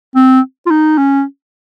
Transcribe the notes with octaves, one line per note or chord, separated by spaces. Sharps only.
C4
F4
D#4
C#4